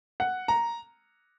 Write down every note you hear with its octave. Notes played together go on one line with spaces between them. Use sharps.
F#5
A#5